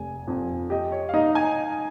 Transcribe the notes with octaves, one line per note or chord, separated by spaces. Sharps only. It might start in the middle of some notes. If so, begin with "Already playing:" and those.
Already playing: F1 G#5
F2
G4 D#5
C#5
F5
D#4 D#5
G#5